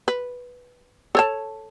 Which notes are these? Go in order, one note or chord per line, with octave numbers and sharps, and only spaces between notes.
B4
A4 C#5 A5